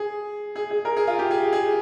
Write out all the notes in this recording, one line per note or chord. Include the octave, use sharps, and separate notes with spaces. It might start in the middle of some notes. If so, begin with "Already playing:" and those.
Already playing: G#4
G#4
G#4
A#4
G#4
F4
G4
G#4
G#4